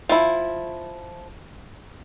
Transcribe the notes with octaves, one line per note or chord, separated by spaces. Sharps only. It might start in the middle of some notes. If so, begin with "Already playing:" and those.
F3 E4